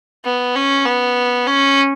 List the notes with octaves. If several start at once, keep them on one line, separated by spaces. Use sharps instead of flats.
B3
C#4
B3
C#4